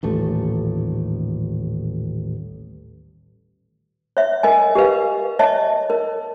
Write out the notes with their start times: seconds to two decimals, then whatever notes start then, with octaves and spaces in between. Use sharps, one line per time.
0.03 D#1 A1 A3
4.17 C#5 E5
4.43 A#4 D#5 G#5
4.75 G4 A#4 B4 F5
5.39 C#5 D#5 E5 A5
5.90 A#4